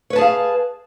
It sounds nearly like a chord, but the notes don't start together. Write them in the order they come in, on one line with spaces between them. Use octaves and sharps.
C#5 B4 A5 G#4 F5